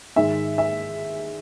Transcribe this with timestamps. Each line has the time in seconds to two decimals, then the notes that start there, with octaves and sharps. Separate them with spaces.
0.16 G#2 D#3 G#3 E5
0.58 E5